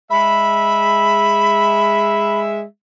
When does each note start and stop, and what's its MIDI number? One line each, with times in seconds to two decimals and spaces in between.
0.11 2.63 56
0.11 2.63 76
0.11 2.40 83